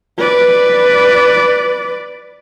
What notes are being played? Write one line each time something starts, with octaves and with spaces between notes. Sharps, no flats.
B4 D5